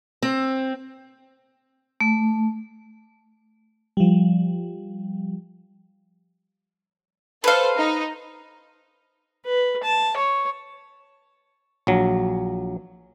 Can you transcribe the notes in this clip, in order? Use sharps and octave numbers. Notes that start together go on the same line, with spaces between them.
C4
A3
F3 G3
A4 B4 C5 F5
D#4
B4
A5
C#5
A#1 F#3